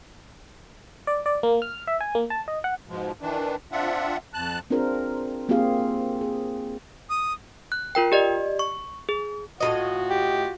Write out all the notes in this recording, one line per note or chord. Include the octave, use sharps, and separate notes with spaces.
D5
D5
A#3
F6
E5
G#5
A#3
A5
D#5
F#5
G#2 B2 F3 G#3
D#3 E3 D4
C4 D4 F4 E5 F#5
F2 A5 F#6
C4 D4 F4 G#4 A#4 C5
A#3 C4 F4 G4 G#4 F5
G#4
D#6
F#6
F4 A#4 G5
G4 D5 D#5
C#6
G#4
A2 D#3 F4 F#4 D#5
G4